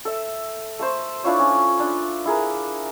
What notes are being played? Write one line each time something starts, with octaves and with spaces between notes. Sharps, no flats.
A4 E5
A3 A4 C5 C6
D4 E4 F4 C#5
C#4
D4
E4 G#4 A#4